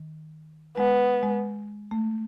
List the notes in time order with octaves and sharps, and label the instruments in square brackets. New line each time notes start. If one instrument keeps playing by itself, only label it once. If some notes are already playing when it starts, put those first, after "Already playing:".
Already playing: [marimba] D#3
[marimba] G#3 [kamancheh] B3
[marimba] G#3
A3